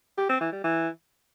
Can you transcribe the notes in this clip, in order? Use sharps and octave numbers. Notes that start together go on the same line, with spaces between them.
G4
C4
E3
G3
E3